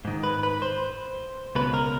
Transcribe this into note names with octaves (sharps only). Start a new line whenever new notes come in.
G#2 D#3
B4
B4
C5
C#2 B2 B4
A#4